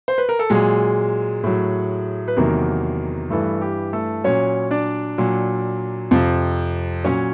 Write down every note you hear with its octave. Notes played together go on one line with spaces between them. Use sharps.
C5
B4
A#4
A4
A#2 F#3 G#3 G#4
A2 F#3
B4
E2 C3 D#3 F#3 A#3 A#4
G2 E3 A3 A4
G4
A3 A4
A#2 F#3 C#4 C#5
D4 D5
A#2 F#3
F2 C3 F3
A#2 F#3 C#4 C#5